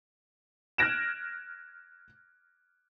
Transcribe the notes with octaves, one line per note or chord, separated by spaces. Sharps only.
F6 F#6 G#6 A#6 D7 E7